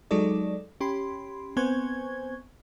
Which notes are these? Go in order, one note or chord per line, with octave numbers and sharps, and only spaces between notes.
F#3 G#3 D#4 A4 D5
C#4 G4 B5 C6
B3 C4 C5 G#5 C#6 G#6